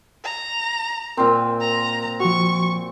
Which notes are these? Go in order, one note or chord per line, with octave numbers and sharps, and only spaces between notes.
A#5
A#2 C4 A#4 G5 C6
A#5
F3 F#4 C#6